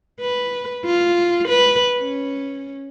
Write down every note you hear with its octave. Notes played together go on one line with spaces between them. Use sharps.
B4
F4
B4
C#4